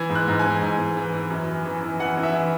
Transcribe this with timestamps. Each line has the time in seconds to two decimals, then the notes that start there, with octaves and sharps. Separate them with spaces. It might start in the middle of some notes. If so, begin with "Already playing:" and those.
Already playing: E3 G#6
0.10 G#2
0.15 F#6
0.28 G#2
0.39 G#5
0.45 E3
0.62 G#2
0.79 G#2
0.97 E3
1.13 E3
1.30 F#2
1.49 E3
1.65 E3
1.83 E3
1.99 E3 F#5
2.17 E3
2.23 E5
2.34 E3